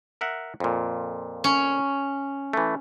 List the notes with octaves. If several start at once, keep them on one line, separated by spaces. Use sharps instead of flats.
A#4 E5 F#5
F2 A#2
C#4
E3 A3